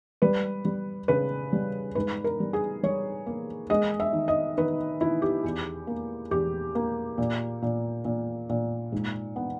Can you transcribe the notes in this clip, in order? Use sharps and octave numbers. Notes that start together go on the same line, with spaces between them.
G3 B4
G3
C#3 B4
G3
G#2 B4
A#4
G3
G#4
G3 C#5
A#3
G#3 D#5
E5
D#3
D#5
D#3 B4
D#3 E4
G4
E2
A#3
E2 G4
A#3
A#2
A#2
A#2
A#2
G#2
B3